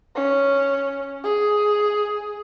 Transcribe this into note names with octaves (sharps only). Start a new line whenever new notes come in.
C#4
G#4